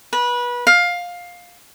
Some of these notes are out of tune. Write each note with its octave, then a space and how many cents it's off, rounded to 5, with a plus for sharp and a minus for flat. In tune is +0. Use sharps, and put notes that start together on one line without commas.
B4 -25
F5 +15